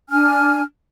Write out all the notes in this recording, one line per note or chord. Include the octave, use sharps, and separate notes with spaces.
D4 G#5 F6